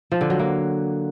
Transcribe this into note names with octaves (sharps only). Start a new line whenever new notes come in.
F3
D3
F#3
A#3